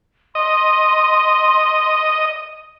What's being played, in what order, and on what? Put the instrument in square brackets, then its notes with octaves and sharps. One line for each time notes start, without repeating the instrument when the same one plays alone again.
[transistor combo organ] D#5 [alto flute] C6